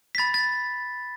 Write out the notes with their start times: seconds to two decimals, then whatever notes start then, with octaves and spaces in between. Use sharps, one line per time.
0.15 B6
0.18 B5 A6
0.34 A6